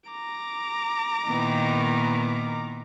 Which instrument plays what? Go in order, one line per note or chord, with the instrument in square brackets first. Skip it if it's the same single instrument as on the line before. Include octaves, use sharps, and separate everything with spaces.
[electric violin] A#5 D6
[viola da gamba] A#2 B3 E4 [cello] D#3